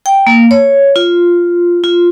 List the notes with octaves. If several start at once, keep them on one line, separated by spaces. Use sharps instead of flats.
G5
A#3
C#5
F4
F4